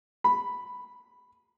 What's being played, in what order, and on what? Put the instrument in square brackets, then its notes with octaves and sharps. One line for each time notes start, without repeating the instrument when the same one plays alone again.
[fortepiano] B5